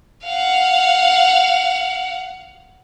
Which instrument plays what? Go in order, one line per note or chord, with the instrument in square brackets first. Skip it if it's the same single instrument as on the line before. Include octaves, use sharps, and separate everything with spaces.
[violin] F5 F#5